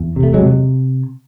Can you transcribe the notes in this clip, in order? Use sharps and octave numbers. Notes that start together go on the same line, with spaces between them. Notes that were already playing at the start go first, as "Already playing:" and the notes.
Already playing: E2
C3
A3
F#3 G#3
C3